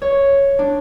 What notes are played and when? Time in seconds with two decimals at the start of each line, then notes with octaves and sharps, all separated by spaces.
0.02 C#5
0.59 D4